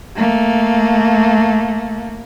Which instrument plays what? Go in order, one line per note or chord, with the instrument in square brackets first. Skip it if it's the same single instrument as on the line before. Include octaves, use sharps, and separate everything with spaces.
[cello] A3 A#3